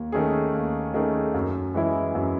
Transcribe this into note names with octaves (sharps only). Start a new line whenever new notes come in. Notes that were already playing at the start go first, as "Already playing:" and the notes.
Already playing: D#2
D#3 A3 C#4 G#4
D#2
D#3 A3 C#4 G#4
F#2
E3 G#3 C#4 E4
F#2